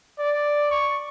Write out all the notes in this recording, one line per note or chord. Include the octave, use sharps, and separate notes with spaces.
D5
C#6